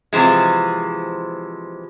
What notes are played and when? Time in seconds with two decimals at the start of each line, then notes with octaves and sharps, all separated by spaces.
0.13 C3 E3 F3 G#3